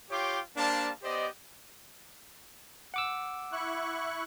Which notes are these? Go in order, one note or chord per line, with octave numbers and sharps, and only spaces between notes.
F4 G4 C#5 G5 C6 D6
G3 A#3 D4 C5 F5 A5
B3 G4 C5 D5 D#5
F#5 D6 E6
E4 C#6 F#6